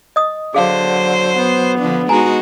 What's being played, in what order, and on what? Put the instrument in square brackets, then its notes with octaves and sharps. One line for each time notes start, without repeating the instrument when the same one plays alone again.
[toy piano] D#5 D#6
[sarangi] D3 [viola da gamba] F#3 C5 [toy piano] G#4 F5
[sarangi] B3
[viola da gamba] D3 F3 D4
[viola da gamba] G#3 D#4 F#4 [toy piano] G#5 A#5